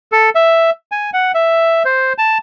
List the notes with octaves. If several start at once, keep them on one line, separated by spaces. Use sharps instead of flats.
A4
E5
G#5
F#5
E5
C5
A5